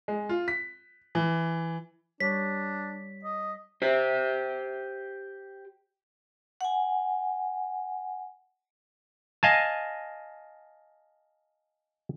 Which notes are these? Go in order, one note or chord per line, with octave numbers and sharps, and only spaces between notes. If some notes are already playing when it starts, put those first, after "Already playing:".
G#3
F4
B6
E3
G3 D4 C#5 B6
D#5
G4 C5
F#5 G#5
D#5 F5 G#5 A5